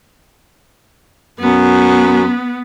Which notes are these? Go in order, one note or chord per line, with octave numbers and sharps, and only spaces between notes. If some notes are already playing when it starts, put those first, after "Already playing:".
F#2 B3